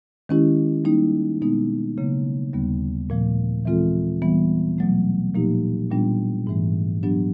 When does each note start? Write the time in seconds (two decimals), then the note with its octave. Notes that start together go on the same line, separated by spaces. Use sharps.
0.29 D#3 G#3 C#4 E4 G4
0.85 G3 A#3 D#4
1.41 B2 G#3 B3 D#4
1.98 C#3 F#3 A#3
2.53 D#2 D3 G3 B3
3.10 A#2 F3 A3
3.65 E3 G#3 C4 F4 A4
4.22 E3 G3 B3
4.78 B2 F#3 A3
5.34 A#2 F3 A#3 D#4 G4
5.91 A#2 G3 B3 D4 F4
6.47 G#2 E3 A3
7.03 F#3 B3 D4 G4